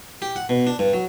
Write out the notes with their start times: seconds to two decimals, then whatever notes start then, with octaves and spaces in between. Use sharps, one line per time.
0.22 G4
0.36 F#5
0.49 B2
0.67 D4
0.79 G2
0.93 F#3